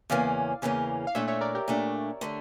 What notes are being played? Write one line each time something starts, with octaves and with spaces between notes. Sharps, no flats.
E2 C#3 E3 A#3 C#4 D5 F5
E2 C#3 E3 A#3 C#4
F5
A#2 A3 D4 C#5 E5
C#5 E5
A#4 D5
G4 A#4
A#2 A3 D4
D3 A3 D4